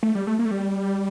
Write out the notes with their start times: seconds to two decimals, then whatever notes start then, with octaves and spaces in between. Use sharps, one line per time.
0.03 A3
0.15 G3
0.27 A3
0.39 A#3
0.45 A3
0.51 G3